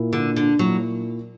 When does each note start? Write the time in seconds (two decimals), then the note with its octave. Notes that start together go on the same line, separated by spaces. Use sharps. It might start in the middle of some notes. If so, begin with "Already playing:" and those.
Already playing: A#2 A#3 E4
0.13 D3
0.36 D3
0.59 A#2 F#3 A#3 E4